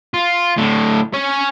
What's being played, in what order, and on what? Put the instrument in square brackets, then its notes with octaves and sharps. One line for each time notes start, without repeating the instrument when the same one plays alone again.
[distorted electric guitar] F4
A2 D3
C#4 C#5